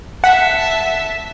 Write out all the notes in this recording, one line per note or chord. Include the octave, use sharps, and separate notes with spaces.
E5 F#5 A5 B6